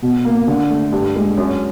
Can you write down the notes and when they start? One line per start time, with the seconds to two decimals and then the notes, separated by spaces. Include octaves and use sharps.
0.02 B2
0.25 A#3
0.47 D3
0.69 A3
0.92 G2
1.15 G#3
1.37 F#2